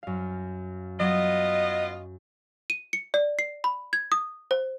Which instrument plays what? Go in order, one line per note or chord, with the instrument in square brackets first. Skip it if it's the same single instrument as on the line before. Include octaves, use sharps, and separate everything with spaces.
[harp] F#2 F5
[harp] F#3 [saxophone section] B3 F4 D#5
[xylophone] D#7
C#7
D5
C7
B5
G#6
D#6
C5